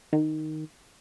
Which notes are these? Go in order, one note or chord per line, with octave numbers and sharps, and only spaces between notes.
D#3